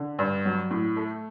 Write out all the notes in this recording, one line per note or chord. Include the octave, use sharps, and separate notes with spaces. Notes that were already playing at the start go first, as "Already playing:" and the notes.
Already playing: D3
G2
F#3
A2
A3